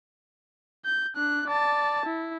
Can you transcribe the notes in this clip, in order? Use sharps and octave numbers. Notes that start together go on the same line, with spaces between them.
G6
D4 F#6
D5 A5
E4